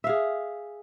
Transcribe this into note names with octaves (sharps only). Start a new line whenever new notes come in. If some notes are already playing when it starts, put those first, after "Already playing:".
G#4 E5 F5